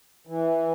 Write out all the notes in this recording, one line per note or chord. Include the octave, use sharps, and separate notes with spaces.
E3